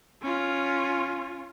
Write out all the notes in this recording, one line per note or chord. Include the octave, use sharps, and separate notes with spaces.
C#4 F4